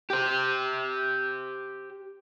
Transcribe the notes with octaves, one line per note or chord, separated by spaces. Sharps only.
G4 C5